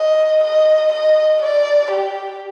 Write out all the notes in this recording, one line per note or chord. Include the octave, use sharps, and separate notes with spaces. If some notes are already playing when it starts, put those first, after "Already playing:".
Already playing: D#5
D#5
D#5
D5
G4